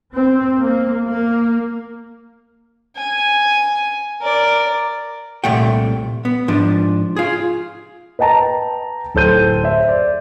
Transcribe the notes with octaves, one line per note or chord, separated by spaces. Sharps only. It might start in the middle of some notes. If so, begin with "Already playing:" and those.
C4
A#3
A#3
G#5
A#4 D5
C2 A#2 A3 F#5 G5
B3
G#2 F3 D4
F4 G#4
B4 D#5 G5 A5 A#5
D1 A4 C5 G6 D#7
C5 E5
D5